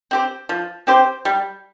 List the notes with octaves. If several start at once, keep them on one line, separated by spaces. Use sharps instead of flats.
C4 G4 C5
F3
C4 G4 C5
G3